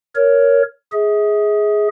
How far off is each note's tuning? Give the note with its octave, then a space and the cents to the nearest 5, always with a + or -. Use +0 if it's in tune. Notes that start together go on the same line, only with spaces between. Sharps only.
A#4 +0 C#5 +10
G#4 +5 E5 -45